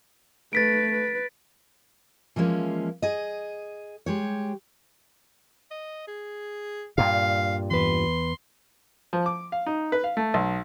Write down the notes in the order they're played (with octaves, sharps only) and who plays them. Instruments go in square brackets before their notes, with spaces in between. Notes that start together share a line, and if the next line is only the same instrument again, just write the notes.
[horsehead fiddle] A3 B4 [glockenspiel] A6 B6 D7
[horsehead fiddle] B4
[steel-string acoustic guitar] E3 F3 G#3 A#3 C#4
G#4 D#5
G#3 G4 C#5
[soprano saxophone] D#5
G#4
[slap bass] G2 A#2 [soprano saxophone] F5
[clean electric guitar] E2 B4 [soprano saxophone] C6
[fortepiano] F3
D6
F5
D#4
B4
F5
A3
B1